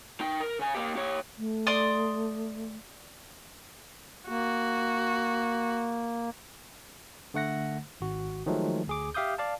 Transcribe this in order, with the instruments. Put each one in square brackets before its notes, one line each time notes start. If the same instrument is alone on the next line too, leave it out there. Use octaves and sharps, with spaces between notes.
[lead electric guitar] D#4 G5
A#4
C#3 G#5
A#3 G4
G4 C#5
[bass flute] A3
[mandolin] D5 C6 D#6
[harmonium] A#3 [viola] F#4
[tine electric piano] D3 A3 F#5 A#6
G#1 F#4
D#3 F3 F#3 G#3 A3
D2 G#4 D6
G4 E5 F5 D6 D#6 G6
D5 F5 A5